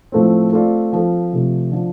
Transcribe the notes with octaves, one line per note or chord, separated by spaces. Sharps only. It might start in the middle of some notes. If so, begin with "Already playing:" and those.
A2 F3 A3 C4
A3 C4 F4 D5
F3 C4 A4
C3 F3 A3
D3 F3 D4